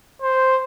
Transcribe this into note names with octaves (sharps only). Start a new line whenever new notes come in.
C5